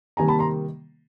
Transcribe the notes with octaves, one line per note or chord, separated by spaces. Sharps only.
C3 D#3 G3 A#3 G#5 A#5
A5 B5
A#5 C6